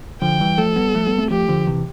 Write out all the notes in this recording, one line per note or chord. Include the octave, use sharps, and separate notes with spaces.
D3 F3 G5
E3 G3
F3 A3 A4
G3 B3
F3 A3
G3 B3
A3 C4
F3 A3 G4
D3 F3
C3 E3